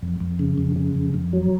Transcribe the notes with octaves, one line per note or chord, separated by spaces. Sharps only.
F2
F2
C#3
F2
C#3
F2
F2
F#3